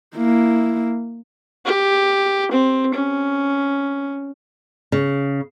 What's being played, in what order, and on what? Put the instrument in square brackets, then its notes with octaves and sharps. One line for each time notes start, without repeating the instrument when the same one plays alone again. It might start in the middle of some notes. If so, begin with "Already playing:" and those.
[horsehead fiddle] A#3 E4
[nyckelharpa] G4
C4
C#4
[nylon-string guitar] C#3